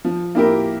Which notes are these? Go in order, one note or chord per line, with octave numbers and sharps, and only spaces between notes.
F3
A#3 E4 G4 A#4